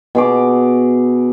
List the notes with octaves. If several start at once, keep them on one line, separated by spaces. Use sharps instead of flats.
B2 G#4 D6